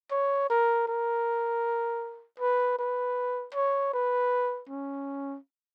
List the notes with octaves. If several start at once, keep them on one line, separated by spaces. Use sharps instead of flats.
C#5
A#4
A#4
B4
B4
C#5
B4
C#4